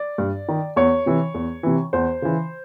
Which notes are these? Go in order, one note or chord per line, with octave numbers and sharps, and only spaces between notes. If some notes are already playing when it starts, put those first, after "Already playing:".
Already playing: D5
G2
D#3
E2 C#5
C3 E3
E2
C3 E3
E2 C5
C#3 E3